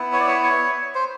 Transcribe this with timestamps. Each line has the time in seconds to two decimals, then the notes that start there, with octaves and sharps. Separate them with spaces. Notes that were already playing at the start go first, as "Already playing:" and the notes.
Already playing: B3 E4
0.13 C#5
0.20 D5
0.27 C#5
0.43 C#5
0.95 C5